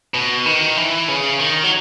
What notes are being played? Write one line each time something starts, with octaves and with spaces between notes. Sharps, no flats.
B2
D#3
E3
C#3
D#3
F#3